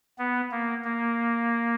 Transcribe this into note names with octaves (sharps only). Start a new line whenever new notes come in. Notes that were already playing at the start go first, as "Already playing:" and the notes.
B3
A#3
A#3